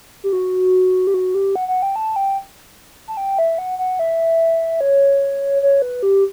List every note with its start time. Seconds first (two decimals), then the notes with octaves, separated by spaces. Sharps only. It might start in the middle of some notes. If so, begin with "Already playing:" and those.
0.24 G4
0.33 F#4
1.07 G4
1.14 F#4
1.35 G4
1.56 F#5
1.68 F#5
1.82 G5
1.96 A5
2.16 G5
3.08 A5
3.17 G5
3.39 E5
3.58 F#5
3.79 F#5
3.99 E5
4.81 C#5
5.62 C#5
5.82 B4
6.03 G4